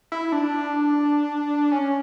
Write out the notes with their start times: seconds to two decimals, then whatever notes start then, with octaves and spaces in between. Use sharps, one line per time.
0.12 E4
0.32 D4
1.71 C#4